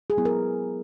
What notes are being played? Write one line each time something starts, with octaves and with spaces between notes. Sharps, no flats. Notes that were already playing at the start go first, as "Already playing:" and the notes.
G#4
F#3 B3 E4
A#4